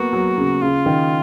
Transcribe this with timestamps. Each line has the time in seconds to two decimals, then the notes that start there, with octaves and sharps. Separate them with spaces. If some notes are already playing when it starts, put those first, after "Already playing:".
Already playing: A#3 B3 F#4
0.13 F#3
0.37 C#3
0.62 C#3 F4
0.86 D#3